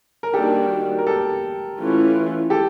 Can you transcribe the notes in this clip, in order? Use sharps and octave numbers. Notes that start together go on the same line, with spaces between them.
A#4
D#3 G3 A#3 D4 F#4 G4 A4
A#4
G4 A4
E3 A3 C#4 F4
G4 A4